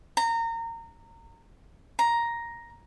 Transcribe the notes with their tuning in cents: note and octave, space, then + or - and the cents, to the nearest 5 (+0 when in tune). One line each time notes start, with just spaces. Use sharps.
A#5 -25
A#5 +5